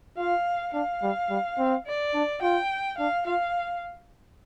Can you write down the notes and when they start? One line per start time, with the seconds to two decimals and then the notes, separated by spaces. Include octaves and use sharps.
0.18 F4 F5
0.74 D4 F5
1.03 G3
1.30 G3
1.58 C4
1.87 D5
2.15 D4
2.42 F4 G5
2.98 D4 F5
3.26 F4 F5